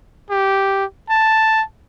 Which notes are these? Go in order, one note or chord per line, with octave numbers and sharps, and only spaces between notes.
G4
A5